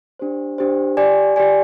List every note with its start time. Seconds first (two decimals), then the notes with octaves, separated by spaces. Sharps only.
0.19 D4 G4 C5
0.58 D4 G4 C5
0.97 G4 D5 G#5
1.36 G4 D5 G#5